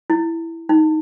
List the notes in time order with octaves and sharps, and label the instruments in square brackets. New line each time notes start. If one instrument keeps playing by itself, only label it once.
[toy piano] E4
D#4